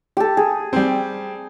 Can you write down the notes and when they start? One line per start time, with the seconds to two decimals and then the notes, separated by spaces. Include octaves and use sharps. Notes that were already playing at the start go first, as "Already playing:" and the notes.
0.17 G4 A4
0.37 G#4
0.73 G3 C4